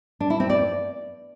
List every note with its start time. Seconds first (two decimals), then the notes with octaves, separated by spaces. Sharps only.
0.20 D4
0.30 E4
0.40 C4
0.50 D5